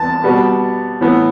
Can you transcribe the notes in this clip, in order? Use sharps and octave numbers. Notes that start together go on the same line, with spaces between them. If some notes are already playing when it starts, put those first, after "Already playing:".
Already playing: E2 B3 A5
B2 G3 B3
A2 E3 B3